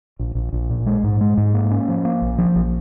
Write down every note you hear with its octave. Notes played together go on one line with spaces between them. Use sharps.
A#1
A#1
A#1
A#2
G#3
G#2
G#3
G#2
A#3
C#4
F3
A#3
A#1
F3
A#1